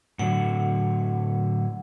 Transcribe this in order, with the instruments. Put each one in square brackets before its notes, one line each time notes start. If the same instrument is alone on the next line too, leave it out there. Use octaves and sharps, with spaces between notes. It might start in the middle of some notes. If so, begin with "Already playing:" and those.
[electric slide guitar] A2 D3 F#3 [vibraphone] F#5